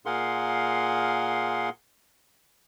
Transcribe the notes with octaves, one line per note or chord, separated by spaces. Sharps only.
A#2 G#4 A#4 F5 F#5 C6